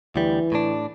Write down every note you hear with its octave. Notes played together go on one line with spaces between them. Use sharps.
D2 E3 G3
A2 D4